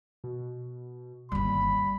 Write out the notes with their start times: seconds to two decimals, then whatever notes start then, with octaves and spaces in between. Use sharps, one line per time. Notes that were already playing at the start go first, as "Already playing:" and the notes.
0.24 B2
1.32 G1 D#2 G3 B5